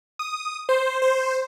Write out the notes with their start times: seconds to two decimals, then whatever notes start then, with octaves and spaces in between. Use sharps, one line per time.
0.19 D#6
0.69 C5
1.02 C5